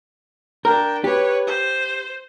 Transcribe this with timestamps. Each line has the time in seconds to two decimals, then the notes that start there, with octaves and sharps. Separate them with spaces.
0.65 D4 A#4 G5
1.04 G4 B4 C#5
1.47 C5